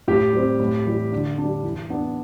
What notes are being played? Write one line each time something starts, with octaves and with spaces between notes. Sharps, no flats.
A2 G4
G3 C4
A2
E3 G3
D3
G3 D4
E3
B3 D4